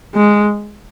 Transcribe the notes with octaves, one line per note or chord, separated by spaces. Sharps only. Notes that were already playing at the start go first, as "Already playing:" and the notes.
G#3